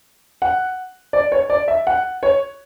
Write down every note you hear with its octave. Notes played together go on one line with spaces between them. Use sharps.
F#5
D5
C#5
D5
E5
F#5
C#5